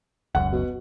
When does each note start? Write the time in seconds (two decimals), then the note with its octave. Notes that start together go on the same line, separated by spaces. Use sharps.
0.35 E1 C#2 F#2 F#5
0.52 B2